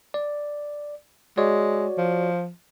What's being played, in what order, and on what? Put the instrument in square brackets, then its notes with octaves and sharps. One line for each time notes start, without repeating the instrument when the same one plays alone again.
[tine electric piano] D5
[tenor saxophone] G#3 [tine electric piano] F#4 C#5 D5
[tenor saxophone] F3